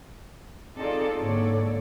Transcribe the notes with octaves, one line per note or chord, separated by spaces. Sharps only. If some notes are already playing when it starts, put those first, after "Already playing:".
C4 D#4 F4 G#4 A4 D5
G#2 D3 A#3 A4 C#5 D5